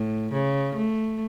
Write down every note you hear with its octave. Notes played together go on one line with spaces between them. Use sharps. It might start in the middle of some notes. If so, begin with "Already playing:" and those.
Already playing: A2
C#3
A3